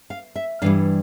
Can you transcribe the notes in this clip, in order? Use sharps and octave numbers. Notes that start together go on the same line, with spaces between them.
F5
E5
G2 E3 G3 F5